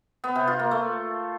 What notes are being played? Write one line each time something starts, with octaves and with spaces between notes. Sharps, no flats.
B3
C3
F4
A#3
A3